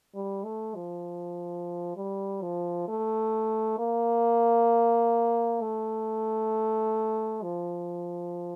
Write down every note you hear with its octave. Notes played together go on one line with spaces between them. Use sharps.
G3
A3
F3
G3
F3
A3
A#3
A3
F3